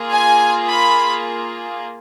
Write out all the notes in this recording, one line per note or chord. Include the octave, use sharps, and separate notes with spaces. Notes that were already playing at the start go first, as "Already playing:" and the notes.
Already playing: A#3 F4 G#4
G#5
B5